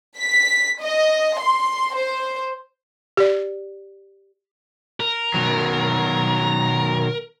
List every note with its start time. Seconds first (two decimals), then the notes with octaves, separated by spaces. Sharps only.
0.18 B6
0.81 D#5
1.39 C6
1.95 C5
3.17 G4 D5
5.00 A#4
5.34 B2 D#3 F#3